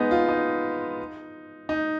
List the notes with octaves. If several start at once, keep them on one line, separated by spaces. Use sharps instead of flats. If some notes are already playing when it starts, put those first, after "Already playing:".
Already playing: G#3 B3 D#4
F4
D#4
D#4